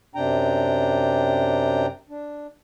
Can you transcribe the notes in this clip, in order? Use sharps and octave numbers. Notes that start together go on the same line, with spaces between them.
F#2 C3 D4 G5 A#5
D4